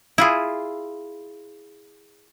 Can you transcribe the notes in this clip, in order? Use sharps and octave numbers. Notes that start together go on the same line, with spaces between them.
E4 F4 G#4